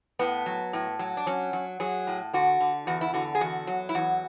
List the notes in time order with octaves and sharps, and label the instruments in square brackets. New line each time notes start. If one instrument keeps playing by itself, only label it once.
[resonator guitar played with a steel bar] A2 B3
F#3
A2
F#3
D4
F#3 C#4
F#3
F#3 G#4
A2
D3 F#4
D3
E2 F#4
E4
D3 F#4
G#4
E2 F#4
F#3
E4
E2 F#4